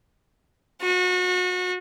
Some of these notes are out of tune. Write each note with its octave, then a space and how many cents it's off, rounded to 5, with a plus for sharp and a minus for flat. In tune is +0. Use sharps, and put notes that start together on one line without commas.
F#4 -30